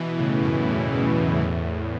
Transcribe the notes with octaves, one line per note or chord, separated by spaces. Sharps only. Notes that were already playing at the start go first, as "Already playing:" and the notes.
Already playing: B2 E3
A2 C#3
F#2 B2
E2 A2
E2
E2
F#2
E2 A2